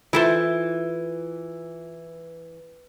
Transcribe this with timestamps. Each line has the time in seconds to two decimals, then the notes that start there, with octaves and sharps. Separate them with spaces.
0.13 E3 E4 F4 A4 C5 D7 E7